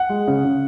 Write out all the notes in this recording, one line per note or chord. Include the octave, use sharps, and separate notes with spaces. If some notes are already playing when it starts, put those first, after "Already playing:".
Already playing: F#5
G#3
C#3
C#3